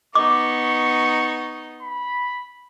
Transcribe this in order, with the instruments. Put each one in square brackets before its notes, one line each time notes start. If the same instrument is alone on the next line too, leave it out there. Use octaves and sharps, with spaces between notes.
[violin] B3 D#4 [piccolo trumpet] C#6 [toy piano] D6
[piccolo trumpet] B5